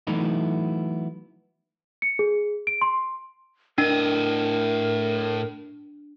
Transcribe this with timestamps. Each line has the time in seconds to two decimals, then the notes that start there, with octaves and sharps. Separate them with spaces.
0.07 E3 F#3 A3 B3 D#4 E4
2.02 C#7
2.19 G#4
2.67 D7
2.81 C6
3.78 A2 D4 A#4 D#5